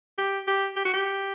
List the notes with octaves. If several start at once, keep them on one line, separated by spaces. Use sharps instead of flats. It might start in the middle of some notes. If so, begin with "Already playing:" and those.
G4
G4
G4
F#4
G4